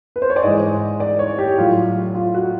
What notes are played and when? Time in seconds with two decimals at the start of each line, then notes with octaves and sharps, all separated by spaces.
0.16 B4
0.22 C5
0.30 C#5
0.36 D5
0.43 G#2 E3 G#3 D#5
1.00 D5
1.19 C#5
1.38 G4
1.58 A2 F#3 F4
2.15 F4
2.34 F#4